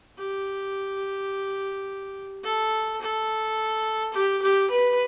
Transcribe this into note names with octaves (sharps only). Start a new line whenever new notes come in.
G4
A4
A4
G4
G4
B4